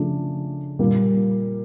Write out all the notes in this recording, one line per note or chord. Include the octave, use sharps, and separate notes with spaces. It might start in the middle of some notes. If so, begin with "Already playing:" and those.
Already playing: C#3 F3 A3 D4
A#2 G3 A#3